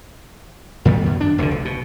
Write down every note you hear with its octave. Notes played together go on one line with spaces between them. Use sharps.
F2 D#3 G3 B3
F#2
D4
F1 D2 A2 D3
B1
B2